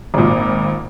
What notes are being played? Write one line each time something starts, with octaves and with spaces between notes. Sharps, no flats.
G#1 A#2